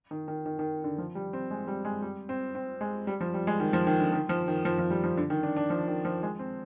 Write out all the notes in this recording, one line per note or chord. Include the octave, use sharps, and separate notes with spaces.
D#3
D#3
D#3
D#3
D3
F3
G3
C4
G#3
G3
G#3
G3
C4
C4
G#3
G3
F3
G3
G#3
D#3
F3
D#3
D3
D#3
F3
D#3
F3
F3
G3
F3
D3
D#3
D4
D4
F3
D#3
F3
G#3
C4